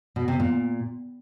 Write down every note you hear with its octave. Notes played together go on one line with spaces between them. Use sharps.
B2
C3
A#2